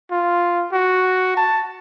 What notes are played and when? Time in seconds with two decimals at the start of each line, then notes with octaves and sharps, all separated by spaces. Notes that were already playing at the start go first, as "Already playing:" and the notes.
0.11 F4
0.72 F#4
1.37 A5